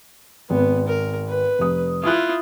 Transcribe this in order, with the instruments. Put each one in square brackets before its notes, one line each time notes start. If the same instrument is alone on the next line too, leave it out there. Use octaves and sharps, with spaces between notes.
[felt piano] G#1 [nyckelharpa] B3
[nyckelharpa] A#4
B4
[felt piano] F1 D#6
[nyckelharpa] E4 F4 [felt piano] D#6 F#6